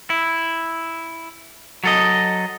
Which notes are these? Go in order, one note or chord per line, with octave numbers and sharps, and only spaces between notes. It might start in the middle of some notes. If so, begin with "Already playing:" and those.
E4
F#3 A4 D#5